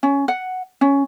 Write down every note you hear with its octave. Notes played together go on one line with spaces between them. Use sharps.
C#4
F#5
C#4